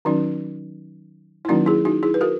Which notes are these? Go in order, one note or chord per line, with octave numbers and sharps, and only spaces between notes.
D#3 F#3 C#4 D#4 F#4
E4
D#3 F#3 A#3 C#4 D#4 F#4
E4 G#4
D#4 F#4
E4 G#4
B4
F#4 A#4